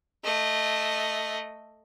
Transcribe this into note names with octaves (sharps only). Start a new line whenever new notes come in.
A3 D#5